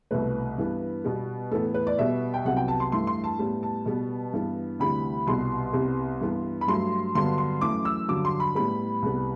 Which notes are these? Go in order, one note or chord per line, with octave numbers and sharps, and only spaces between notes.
C2 B2 A3 B4
G2 E3 B3
B2 G3 B3
A2 E3 B3 A4
B4
D5
B2 G3 B3 E5
G5
C2 C3 F#3 B3 F#5
G5
A5
C6
G2 E3 A3 C6
C6
A5
A2 G3 B3
A5
B2 G3 B3
G2 E3 B3
D2 C3 E3 G3 B5
C2 B2 G3 B3 C6
C2 C3 G3 B3
G2 E3 B3
B5
G2 F#3 A3 C6
G2 D3 F#3 B3 C6
C6
F#2 E3 A3 D6
E6
G2 D3 F#3 D6
C6
B5
A2 G3 B3 B5
C2 C3 G3 B3